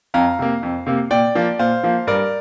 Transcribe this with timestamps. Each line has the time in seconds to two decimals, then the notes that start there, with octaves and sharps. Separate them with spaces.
0.14 F2 F5 A#5
0.39 C3 A#3
0.63 F2
0.86 C3 A#3
1.10 A#2 D5 G5
1.35 F3 A#3
1.59 A#2 C5 F5
1.84 F3 A#3
2.07 G2 A#4 D5